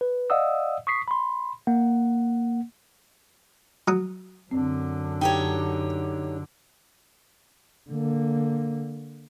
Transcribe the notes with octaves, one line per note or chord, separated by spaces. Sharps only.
B4
D5 D#5 F5 F#5 D#6 E6
C#6 D#6 B6 C7
B5 C6
A#3 F#5
F#3 D#6
F#2 D3 C4
D#4 G4 C#5 G5
D3 A#3